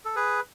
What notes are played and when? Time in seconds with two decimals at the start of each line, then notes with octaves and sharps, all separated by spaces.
0.05 A4
0.16 G#4 B4